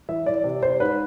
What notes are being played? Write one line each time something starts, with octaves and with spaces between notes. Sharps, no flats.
E3 E5
E3 D5
C3
C3 C5
G#2 B4